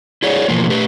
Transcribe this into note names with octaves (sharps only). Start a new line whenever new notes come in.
E4 G#4 C#5 D5
B2 E3 F3 A#3
A3 G4 B4